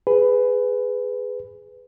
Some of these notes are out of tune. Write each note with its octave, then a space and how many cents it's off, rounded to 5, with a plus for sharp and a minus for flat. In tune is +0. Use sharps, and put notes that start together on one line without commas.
G#4 +0 B4 +10